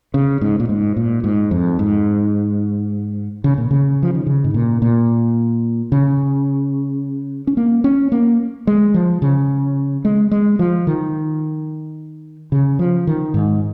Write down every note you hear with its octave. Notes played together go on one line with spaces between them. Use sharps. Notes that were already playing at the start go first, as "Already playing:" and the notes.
C#3
G#2
A#2
G#2
A#2
G#2
F2
G#2
C#3
A#2
C#3
F3
D#3
C#3
G#2
A#2
A#2
C#3
C#4
A#3
C#4
A#3
G#3
F3
C#3
G#3
G#3
F3
D#3
C#3
F3
D#3
G#2